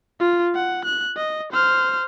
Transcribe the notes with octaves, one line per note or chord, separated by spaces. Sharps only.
F4
F#5
F#6
D#5
C5 F6